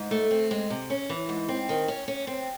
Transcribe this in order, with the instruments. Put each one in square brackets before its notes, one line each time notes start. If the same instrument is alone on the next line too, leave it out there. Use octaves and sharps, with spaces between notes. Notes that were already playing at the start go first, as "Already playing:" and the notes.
Already playing: [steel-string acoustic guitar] G#2
A3
C4
G#3
C3
C#4
E3
G#2
C4
D#3
C#4
C#4
C4